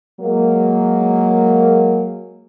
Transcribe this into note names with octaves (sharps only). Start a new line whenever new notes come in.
F#3 G#3 A#3